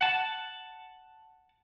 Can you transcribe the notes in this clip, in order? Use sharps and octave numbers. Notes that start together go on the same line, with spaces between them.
F#5 A5